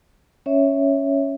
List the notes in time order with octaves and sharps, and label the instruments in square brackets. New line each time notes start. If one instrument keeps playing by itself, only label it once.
[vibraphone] C#4 C#5 E5